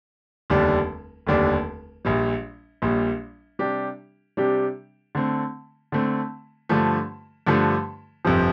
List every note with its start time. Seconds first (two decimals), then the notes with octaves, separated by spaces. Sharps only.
0.50 F1 D#2 D3 G3 D4
1.27 F1 D#2 D3 G3 D4
2.05 A#1 A#2 G3
2.82 A#1 A#2 G3
3.59 C3 G3 D4 G4
4.37 C3 G3 D4 G4
5.15 D3 A3 C4
5.92 D3 A3 C4
6.69 G2 D3 F3 A3
7.47 G2 D3 F3 A3
8.25 G1 F2 C3 F3